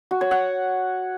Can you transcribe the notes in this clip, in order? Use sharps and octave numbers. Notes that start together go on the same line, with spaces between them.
F#4
C#5
F#5